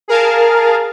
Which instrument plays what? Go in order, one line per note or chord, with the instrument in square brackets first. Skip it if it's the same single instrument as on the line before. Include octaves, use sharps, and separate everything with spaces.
[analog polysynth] G#4 A#4 F5 A5